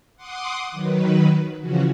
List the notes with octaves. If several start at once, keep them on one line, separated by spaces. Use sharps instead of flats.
F#5 C6 D6 D#6
D#3 F#3 B4
C#3 E3 F3 C#4 F#4